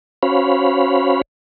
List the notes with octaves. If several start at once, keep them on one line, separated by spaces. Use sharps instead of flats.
C#4 F#4 C5 C#5 F5 B5